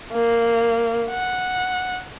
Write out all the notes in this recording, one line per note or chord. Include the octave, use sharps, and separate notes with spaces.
A#3
F#5